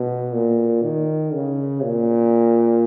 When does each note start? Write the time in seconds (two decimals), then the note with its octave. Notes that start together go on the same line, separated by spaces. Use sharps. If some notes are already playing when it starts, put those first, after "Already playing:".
Already playing: B2
0.33 A#2
0.83 D#3
1.34 C#3
1.85 A#2